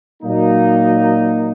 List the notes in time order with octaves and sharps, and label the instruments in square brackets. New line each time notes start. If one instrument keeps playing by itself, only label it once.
[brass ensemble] A#2 F#3 A#3 D#4